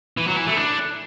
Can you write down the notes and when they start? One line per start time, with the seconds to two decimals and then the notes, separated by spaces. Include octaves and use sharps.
0.17 E3
0.27 F#3
0.37 E3
0.47 A3
0.57 D4